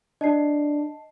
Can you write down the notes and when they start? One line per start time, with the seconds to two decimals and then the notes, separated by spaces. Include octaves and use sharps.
0.21 D4 D#5 A5 C7